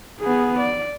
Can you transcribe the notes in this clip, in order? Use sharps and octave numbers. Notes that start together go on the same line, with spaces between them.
B3 G#4
D5